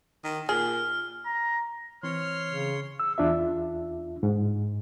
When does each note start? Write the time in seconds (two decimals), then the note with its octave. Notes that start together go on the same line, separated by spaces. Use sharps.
0.24 D#3
0.49 A#2 G#4 F6
1.25 A#5
2.03 E3 C4 C#5 C6 F6
2.52 C#3
3.00 E6
3.18 E2 D4 F4 E5
4.23 G#2